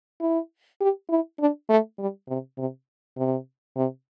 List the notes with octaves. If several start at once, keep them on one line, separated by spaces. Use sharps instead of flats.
E4
G4
E4
D4
A3
G3
C3
C3
C3
C3